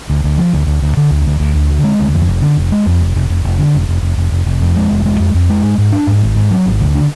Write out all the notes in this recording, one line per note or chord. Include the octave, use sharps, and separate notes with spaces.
D2
D2
F3
D2
D2
D2
D3
D2
D2
D2
D2
D3
G#3
D2
F2
F1
D3
F1
G#3
F2
F1
F1
F1
F1
D3
F1
F1
F1
F1
F1
F1
F2
G#3
F1
G#3
F2
F2
G#3
G#2
G#2
D4
G#2
G#1
G#2
F#3
G#1
D2
D3